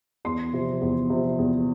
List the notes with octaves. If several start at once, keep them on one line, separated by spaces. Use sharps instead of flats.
E2 C6
C3 F3
E2
C3 F3
E2